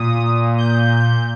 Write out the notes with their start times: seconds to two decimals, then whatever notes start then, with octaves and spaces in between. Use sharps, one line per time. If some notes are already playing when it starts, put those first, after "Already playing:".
Already playing: A#2 D#6
0.58 G6